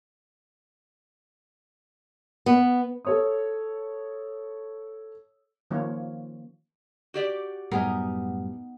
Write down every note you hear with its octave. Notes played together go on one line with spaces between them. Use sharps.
B3
A4 C#5 D#6
D#3 F3 A#3 C#4 F4 C#5
F#4 G4 D5
F#2 A2 G3 B3 D#4 G#4 A#4